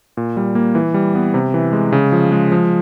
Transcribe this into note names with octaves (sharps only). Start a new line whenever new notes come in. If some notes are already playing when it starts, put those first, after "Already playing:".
A#2
G3
A#3
E3
G3
B3
C3
E3
G#3
C#3
F3
G#3
F3